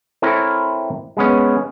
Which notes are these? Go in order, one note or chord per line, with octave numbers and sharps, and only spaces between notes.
C4 E4 A4 A#4 C#5 E5
G#3 B3 C#4